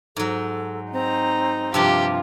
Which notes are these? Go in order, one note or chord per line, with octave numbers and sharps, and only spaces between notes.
G#2 F#3 A4
C4 D#4 A#5
G2 C3 F3 F4 G4